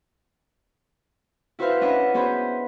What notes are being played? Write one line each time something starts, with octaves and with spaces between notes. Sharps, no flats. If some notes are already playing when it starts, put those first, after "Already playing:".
E4 F#4 B4 C5 E5 F5
C#4 D4 D#5 E5 F#5 B5
B3 F#4 G#4 C5 B5